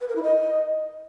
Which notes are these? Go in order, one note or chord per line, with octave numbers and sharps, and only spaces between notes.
B4
A#4
E4
D#5